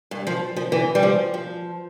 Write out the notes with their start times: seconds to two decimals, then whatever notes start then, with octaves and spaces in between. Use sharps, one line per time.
0.11 G2
0.27 F3
0.56 F3
0.72 E3
0.95 G3
1.03 F3
1.34 F3